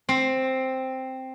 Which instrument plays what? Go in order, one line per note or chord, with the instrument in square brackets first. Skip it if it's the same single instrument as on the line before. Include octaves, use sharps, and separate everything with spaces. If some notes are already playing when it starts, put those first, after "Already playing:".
[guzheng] C4